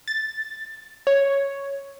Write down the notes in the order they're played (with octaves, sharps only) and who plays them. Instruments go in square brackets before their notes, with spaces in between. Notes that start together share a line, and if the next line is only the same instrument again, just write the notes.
[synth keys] A6
C#5